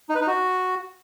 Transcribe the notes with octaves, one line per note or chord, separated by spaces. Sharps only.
D#4
B4
D#4
F#4